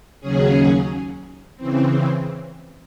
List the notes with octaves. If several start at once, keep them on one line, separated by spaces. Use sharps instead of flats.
D#2 C#3 F#3 C#4 G#4
C#3 E3 C4